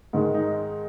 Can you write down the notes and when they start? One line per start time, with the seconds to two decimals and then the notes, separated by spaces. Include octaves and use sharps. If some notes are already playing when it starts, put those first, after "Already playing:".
0.13 G#2 D#3 G#3
0.34 D#4